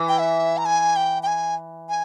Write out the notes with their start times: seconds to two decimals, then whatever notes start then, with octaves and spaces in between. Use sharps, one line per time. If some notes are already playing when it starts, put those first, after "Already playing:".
Already playing: E3
0.08 G5
0.19 E5
0.58 A#5
0.65 G#5
0.96 G5
1.23 G5
1.27 G#5
1.89 G#5